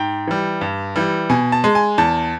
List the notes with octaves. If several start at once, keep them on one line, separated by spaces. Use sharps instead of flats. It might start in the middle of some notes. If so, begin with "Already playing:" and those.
Already playing: G#2 G5
E3 G3
G2
E3 G3
B2 G#5
A5
G#3
G#5
E2 A5